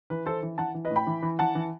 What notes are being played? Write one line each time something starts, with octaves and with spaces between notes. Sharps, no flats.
E3 B4
E3 A4 C5
E3
E3 F#5 A5
E3
B4 D#5
A2
G5 B5
E3
E3
E3 F#5 A5
E3